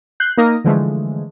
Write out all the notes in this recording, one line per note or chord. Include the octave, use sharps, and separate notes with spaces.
F#6 G6 C7
A#3 D#4 A#4 D#6 A#6
D3 E3 F3 G#3 A3